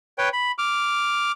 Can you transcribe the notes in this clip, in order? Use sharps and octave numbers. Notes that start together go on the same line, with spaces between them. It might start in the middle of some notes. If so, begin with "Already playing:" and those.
B4 C#5 G5
B5
D6 F6